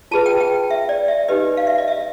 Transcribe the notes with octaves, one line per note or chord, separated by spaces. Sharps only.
F4 G#4 B4 A5
G5
G5
E5
D5
E5
D#4 G4 B4 D#5
F5
E5
D#5
E5